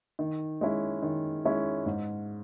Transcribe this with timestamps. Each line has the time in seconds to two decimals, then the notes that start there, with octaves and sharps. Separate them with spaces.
0.19 D#3
0.61 G#3 C#4 E4
1.02 D#3
1.45 G#3 C#4 E4
1.86 G#2